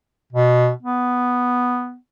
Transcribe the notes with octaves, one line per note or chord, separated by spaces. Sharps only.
B2
B3